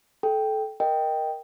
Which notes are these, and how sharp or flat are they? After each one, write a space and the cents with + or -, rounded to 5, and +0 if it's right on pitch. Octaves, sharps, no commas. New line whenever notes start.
A4 -20 G5 +0
A#4 +5 D#5 +0 G5 +0